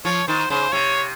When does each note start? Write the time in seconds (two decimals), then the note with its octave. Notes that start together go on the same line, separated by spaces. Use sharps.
0.05 F3 C#5
0.28 D#3 C5
0.50 C#3 C5
0.73 C3 C#5